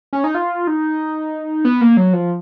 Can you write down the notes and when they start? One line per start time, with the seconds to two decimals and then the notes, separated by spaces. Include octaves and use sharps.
0.13 C#4
0.24 D#4
0.35 F4
0.67 D#4
1.65 B3
1.81 A#3
1.97 F#3
2.13 F3